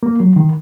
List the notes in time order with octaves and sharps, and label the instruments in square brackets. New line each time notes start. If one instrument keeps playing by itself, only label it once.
[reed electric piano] A#3
F#3
D#3